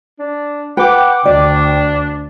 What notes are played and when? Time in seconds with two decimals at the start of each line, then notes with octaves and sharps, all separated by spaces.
0.19 D4
0.77 B4 F#5 G5 D6
1.25 D2 D4 D5